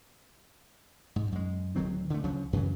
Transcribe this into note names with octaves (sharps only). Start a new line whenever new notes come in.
G#2
F#2 G#3
D1 D#3 F#3 C4
D3 A3
C#2 C#3 F3 F#3
F#2 C#3 E3